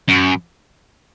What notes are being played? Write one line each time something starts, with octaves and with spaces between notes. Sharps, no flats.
F#2